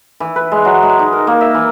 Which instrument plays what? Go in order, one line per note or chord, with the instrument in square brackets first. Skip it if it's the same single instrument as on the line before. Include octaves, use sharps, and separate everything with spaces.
[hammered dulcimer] E3
B4
G#3
F#3
G#3
D#4
A#4
A#3
E5
E3